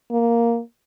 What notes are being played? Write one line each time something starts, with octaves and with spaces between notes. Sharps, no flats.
A#3